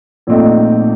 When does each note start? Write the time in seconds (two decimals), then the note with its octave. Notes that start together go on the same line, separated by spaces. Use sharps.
0.27 A#1 A#2 A3 C4 D#4